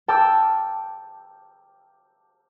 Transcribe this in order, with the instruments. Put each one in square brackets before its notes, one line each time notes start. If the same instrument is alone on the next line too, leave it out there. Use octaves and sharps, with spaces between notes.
[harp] G5 A5 D6 E6 F6